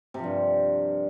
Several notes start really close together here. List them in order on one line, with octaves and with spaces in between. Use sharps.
C3 F3 G2